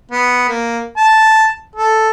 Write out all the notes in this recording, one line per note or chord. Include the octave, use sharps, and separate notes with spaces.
B3
A#3
A5
A4